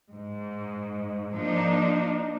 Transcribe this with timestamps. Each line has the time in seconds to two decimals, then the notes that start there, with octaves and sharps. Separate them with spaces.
0.10 G#2
1.32 F3 A#3 D4 D#4